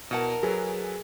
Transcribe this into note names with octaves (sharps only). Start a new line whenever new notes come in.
B2 E4 A#4 F#5 A5
F#3 G#4 A4 B4